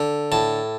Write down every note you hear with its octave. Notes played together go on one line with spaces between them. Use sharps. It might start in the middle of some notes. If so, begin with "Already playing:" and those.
Already playing: D3
A2 A5